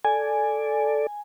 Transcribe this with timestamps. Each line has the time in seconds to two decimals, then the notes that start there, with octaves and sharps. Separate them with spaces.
0.05 A4 D5 G#5